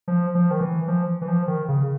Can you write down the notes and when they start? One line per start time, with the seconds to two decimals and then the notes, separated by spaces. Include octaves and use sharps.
0.08 F3
0.35 F3
0.51 D#3
0.61 E3
0.88 F3
1.21 E3
1.28 F3
1.48 D#3
1.68 C#3